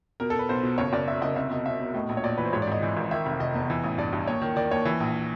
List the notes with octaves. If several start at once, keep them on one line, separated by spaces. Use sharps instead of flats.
B2 A#4
A4
B2 B4
B1 C5
B2
F#1 C#5
F#1 D5
F#2 E5
F#1 D#5
C2 E5
B2 D#5
B2 E5
B2
A2 D#5
A#1
C#5
A#1 D5
E3 B4
C5
G#2 C#5
D5
G#1 D#5
E3
G#1
D#3 E5
F1
F1 D#5
E2
E3
A1
G2 D5
G2
D#2 C#5
D#3
D#3 D5
D#2 C#5
E3
A#1